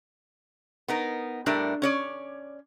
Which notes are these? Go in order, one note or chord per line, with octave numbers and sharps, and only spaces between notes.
B3 D#4 A#4
A2 G3 A3 D4 A#4
C#4 C#5 D5